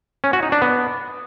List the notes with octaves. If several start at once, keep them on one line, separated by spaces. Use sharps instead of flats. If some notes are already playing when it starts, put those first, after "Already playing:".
C#4
F#4
D#4
D4
B3